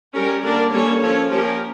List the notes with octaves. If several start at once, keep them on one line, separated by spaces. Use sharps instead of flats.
G3 C#4 G4 A#4
D3 G3 A#3 D4 A#4 D5
G3 A#3 C#4 A4 C#5
F3 C#4 A4 C#5
F3 A#3 C#4 G4 A#4